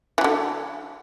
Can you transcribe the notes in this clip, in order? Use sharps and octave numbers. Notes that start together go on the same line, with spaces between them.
D3 E3 F#3